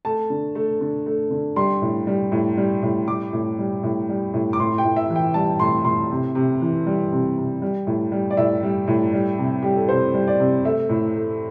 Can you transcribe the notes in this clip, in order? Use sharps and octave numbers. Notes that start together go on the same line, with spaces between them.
A3 A5
D3
A3
D3
A3
D3
G3 C6
A2
G3
A2
G3
A2
G3 D6
A2
G3
A2
G3
A2
D6
A2 C6
G5
A2
E5
E3
G5
G3 A5
A2 C6
A2 C6
C3
C3
E3
G3
C3
C3
G3
A2
G3
D5
A2 E5
G3
A2
G3
C3
G3 G4
A4
C3 C5
G3
D5
C3
A3 E5
A2
A3